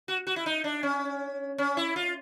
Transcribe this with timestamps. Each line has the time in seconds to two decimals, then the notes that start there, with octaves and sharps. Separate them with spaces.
0.08 F#4
0.27 F#4
0.36 E4
0.46 D#4
0.64 D4
0.83 C#4
1.58 C#4
1.77 E4
1.96 F4